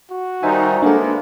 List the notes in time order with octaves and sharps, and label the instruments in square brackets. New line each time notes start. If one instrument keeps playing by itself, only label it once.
[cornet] F#4
[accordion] D#3 G3 D#4 [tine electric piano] C5 E5 G#5
[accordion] G#3 B3 [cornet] A#3 [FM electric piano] D4 A4